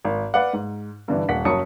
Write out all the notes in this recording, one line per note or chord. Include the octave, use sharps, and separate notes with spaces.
G#1
B4 D5 F5 F#5
G#2
G2 D3 E3
D#1 F#5 B6
F#1 F#4 C#5 A5 D#6 C#7